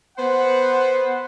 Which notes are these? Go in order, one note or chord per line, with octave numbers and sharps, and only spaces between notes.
B3 C5 F#5